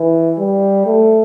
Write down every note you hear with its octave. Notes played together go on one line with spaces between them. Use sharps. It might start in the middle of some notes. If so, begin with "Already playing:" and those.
Already playing: E3
G3
A3